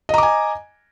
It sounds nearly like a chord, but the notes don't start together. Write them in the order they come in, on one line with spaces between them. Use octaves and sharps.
D#5 A#5 D6 G#5